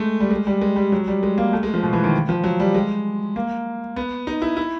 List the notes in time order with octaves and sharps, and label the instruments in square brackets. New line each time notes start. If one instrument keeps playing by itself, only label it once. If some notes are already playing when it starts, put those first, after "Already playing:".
Already playing: [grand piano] G#3 A3
G3
G#3
G3
G#3
G3
F#3
G3
G#3
A#3
A3
G#3
F3
B2
E3
D#3
F3
F#3
G3
G#3
A#3
B3
D#4
E4
E4